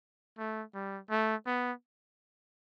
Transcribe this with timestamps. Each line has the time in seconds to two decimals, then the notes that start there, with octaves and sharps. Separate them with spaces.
0.38 A3
0.74 G3
1.10 A3
1.47 B3